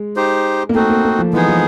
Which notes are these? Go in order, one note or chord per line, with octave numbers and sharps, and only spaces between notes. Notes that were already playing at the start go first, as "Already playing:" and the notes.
Already playing: G#3
D#4 G4 C5
A#3
A3 C4 D#4 F#4
A#3
A#3
F3
E3 G#3 B3 D#4 G#4
F3